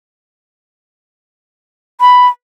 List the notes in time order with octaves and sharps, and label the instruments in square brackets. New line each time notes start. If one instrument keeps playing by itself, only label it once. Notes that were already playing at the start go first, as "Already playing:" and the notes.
[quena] B5